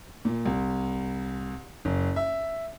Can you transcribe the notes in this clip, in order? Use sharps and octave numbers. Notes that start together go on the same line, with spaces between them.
A#2
C2
F#1
E5